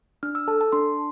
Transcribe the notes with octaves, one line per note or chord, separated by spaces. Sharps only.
D4 F6
E6
A4 A5
A5
D4 C6